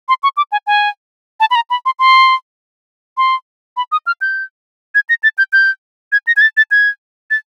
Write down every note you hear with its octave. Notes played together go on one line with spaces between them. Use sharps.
C6
C#6
D6
G#5
G#5
A5
B5
A#5
B5
C6
C6
C6
B5
D#6
F6
G6
G#6
A#6
A6
G6
G6
G#6
A#6
G#6
A6
A6
G#6
A6